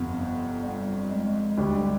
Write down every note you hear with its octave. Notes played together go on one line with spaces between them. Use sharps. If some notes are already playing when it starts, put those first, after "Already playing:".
Already playing: G1 F2 C3 B3
G3
G#3
D2 D3 G3 D4 G4